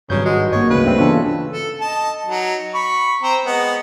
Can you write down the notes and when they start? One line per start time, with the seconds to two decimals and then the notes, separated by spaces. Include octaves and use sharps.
0.10 G#1 G2 C#3 F#3 G6
0.26 G#3 F#4
0.52 A#3 C#5 D#5
0.70 D2 G#2 C#3 B4
0.84 G2 A3 C4
0.98 C#3 E3 B3 D4 F4 A4
1.51 A4
1.81 D#5 A5
2.26 F#3 D#4
2.74 B5 C#6
3.22 C4 C5 A#5
3.46 G#3 B3 D#5